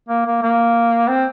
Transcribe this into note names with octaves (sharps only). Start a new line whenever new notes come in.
A#3
A#3
A#3
C4